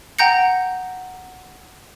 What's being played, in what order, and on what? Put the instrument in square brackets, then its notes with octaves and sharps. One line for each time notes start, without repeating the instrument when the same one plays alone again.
[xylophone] F#5 G5 A#5 G6 A#6 C#7